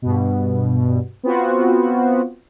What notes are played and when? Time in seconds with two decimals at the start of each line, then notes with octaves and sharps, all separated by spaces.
0.02 G2 B2
1.23 B3 C4 F4 F#4